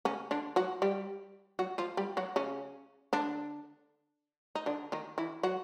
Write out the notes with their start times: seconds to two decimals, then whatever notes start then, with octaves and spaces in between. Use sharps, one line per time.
0.05 C#3 C#4
0.31 D3 D4
0.56 F#3 F#4
0.82 G3 G4
1.59 F#3 F#4
1.78 F3 F4
1.97 G3 G4
2.17 F#3 F#4
2.36 C#3 C#4
3.13 D3 D4
4.55 D#4
4.66 D3 D4
4.92 D#3 D#4
5.18 E3 E4
5.43 F#3 F#4